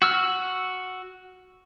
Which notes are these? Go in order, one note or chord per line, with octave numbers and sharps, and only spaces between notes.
F#4 E6 F6